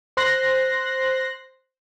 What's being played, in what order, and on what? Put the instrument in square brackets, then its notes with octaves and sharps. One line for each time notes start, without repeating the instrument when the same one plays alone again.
[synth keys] C5 C6 F#6 A#6